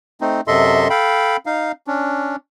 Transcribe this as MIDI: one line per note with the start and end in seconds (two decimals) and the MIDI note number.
0.21 0.41 57
0.21 0.41 60
0.21 0.41 63
0.47 0.88 42
0.47 0.88 48
0.47 0.88 69
0.47 0.88 75
0.47 0.88 76
0.47 0.88 84
0.90 1.37 69
0.90 1.37 77
0.90 1.37 79
0.90 1.37 83
1.46 1.72 63
1.46 1.72 77
1.87 2.36 61
1.87 2.36 62